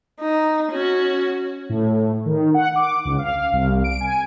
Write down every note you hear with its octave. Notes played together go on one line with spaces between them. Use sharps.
D#4
C#4 F#4
A2
D#3
F#5
D6
C#2
F5
C2
D7
G#5